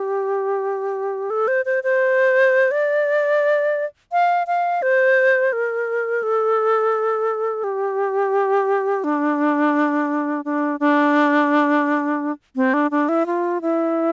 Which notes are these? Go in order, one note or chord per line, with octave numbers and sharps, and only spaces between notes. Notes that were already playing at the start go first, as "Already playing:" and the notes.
Already playing: G4
A4
C5
C5
C5
D5
F5
F5
C5
A#4
A4
G4
D4
D4
D4
C4
D4
D4
E4
F4
E4